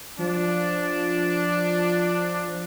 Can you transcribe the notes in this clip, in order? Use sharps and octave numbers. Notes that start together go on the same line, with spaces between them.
F3 D4